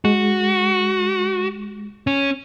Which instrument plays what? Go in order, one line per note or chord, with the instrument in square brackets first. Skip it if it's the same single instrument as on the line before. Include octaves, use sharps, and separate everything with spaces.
[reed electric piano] G#3 [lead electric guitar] F#4
[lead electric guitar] C#4